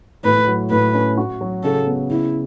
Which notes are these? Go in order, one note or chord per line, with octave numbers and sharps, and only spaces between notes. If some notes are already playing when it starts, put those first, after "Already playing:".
A2 B4
F#3
A2 B4
C#4
F#4
F#3
C#3 A4
B3
C#3 E4